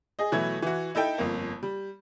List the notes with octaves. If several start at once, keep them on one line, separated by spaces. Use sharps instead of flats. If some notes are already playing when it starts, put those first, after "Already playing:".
G#4 D#5
B2 E3 F#3 A3 E4 G#6
E3 F#4
D#4 E4 A4 G5
G1 F2 A#3
G3